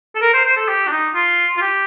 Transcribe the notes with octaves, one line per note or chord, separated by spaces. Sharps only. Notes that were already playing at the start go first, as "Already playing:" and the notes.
A4
A#4
C5
C5
A4
G4
D4
D#4
F4
F4
G4